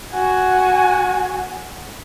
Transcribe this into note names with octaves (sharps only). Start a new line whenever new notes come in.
F#4 G#5